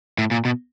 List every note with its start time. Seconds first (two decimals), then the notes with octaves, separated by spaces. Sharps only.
0.18 A2
0.31 A#2
0.45 B2